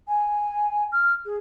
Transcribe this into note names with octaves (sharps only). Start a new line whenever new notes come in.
G#5
F6
G#4